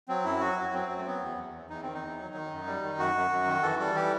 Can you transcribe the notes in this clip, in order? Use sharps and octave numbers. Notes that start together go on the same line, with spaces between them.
F#3 C4
F#2 E4
F#3 F#4
F#2
F#3 C4
F#3
A3
F#3 B3
E2
E2
E2
E2 D#4
D#3 C4
D#4
E2
F#3
D#3
F#2
G3
D#3
F#2 F#4
F#2
F#2
D#3
E3 A4
G3 A4
E3 G4